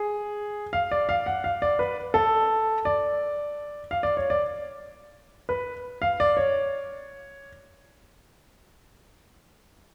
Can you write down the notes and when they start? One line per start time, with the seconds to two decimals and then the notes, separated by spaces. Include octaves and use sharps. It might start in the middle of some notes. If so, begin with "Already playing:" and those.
Already playing: G#4
0.73 F5
0.91 D5
1.09 F5
1.26 F#5
1.44 F5
1.62 D5
1.79 B4
2.14 A4
2.85 D5
3.91 F5
4.03 D5
4.17 C#5
4.30 D5
5.49 B4
6.02 F5
6.20 D5
6.37 C#5